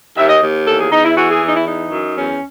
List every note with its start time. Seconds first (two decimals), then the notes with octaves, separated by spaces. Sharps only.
0.17 D#2 E5
0.29 D#5
0.42 D#2
0.67 E2 A4
0.80 G#4
0.92 E2 D#4
1.05 E4
1.17 E3 F#4
1.30 G#4
1.42 E2
1.47 D#4
1.55 E4
1.66 E3 D#4
1.92 F#2
2.16 E2 C#4